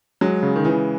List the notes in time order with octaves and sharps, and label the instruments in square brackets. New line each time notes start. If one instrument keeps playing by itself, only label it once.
[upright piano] F#3 [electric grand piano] G#3
[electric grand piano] C#3
[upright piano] D#3
[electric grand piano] C#3 [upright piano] E3